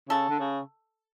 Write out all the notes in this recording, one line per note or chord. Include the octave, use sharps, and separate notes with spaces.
C#3 A4
D3
C#3